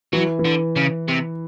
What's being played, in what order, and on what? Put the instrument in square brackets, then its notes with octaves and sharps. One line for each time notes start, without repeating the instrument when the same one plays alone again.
[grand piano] E3 [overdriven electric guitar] F#3
[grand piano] E3
[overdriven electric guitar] D3
C#3
C3